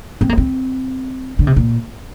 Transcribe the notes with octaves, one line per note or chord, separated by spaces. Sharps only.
C4
A#3
C4
D3
C3
A#2